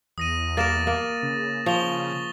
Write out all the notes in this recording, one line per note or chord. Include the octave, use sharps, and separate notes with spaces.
E2 D#6 A#6 D#7
A#3 A#4 A6 A#6 E7
A#3
C#3
F3 C#6 F7 G7